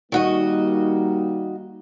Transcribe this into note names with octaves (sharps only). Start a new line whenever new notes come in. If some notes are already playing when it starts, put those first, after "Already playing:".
D#3 G3 A#3 D#4 F#4 D#5